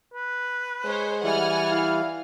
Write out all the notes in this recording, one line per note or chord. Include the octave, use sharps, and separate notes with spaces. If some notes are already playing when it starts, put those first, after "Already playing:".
B4
G#3 C5 C#5
E3 G3 F#5 G#5 F6
E4 F5